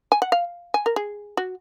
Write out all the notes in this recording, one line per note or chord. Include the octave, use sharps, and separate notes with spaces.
G#5
F#5
F5
G#5
A#4
G#4
F#4